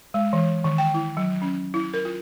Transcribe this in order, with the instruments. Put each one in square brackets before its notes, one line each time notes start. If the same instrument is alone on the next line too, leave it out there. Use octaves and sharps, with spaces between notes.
[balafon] G#3
E3
D#3
G5
E4
F#3
C#4
E4
A#4
F4